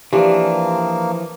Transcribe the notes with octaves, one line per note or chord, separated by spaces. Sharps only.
E3 F3 A#3 D4 G4